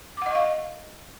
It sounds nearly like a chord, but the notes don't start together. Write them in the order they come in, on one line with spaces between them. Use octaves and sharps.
D6 F#5 D#5 C#6 F5